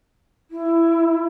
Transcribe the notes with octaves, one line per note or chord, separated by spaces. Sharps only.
E4